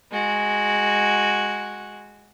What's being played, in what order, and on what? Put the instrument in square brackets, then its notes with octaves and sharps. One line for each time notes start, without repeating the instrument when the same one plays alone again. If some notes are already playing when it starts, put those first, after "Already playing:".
[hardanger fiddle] G#3 F#4